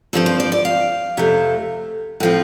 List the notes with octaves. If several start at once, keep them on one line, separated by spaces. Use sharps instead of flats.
G2 F3 C4 A4
C5
D5
D5
F5
F2 C3 A3
A2 F3 C4